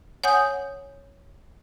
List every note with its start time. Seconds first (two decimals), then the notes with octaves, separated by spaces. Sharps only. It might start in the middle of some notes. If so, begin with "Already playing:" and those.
0.24 C#5 F#5 G#5 D#6 G6